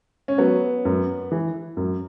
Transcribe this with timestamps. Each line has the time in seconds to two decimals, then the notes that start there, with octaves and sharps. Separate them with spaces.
0.28 C#4
0.38 F#3 B3
0.85 F#2
1.32 E3
1.77 F#2